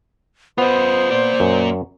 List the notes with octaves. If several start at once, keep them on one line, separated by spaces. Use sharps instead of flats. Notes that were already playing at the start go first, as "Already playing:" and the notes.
B3 F4 C5 D#5
A#3 D5
F#2